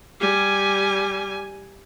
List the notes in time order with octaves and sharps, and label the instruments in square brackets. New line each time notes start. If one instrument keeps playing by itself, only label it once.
[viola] G3 G#5